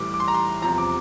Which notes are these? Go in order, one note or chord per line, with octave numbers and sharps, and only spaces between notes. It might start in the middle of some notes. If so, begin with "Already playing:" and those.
Already playing: A1 A2 E3 G3 D6
D6
C6
A#5
C6
E2 C3 F3 A#5
D6